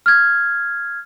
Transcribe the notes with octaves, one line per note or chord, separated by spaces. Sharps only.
F6 G#6